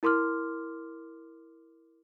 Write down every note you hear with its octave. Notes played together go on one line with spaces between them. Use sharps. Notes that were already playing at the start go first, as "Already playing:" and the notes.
E4 A#4 C6 D6 F6